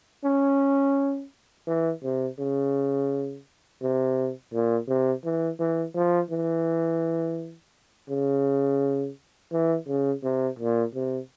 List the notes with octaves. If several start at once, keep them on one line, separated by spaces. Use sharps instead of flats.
C#4
E3
C3
C#3
C3
A#2
C3
E3
E3
F3
E3
C#3
E3
C#3
C3
A#2
C3